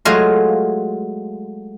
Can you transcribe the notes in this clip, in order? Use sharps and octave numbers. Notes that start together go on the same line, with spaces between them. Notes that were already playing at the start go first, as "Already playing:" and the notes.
F#3 G#3 A3 F4 D#5 F5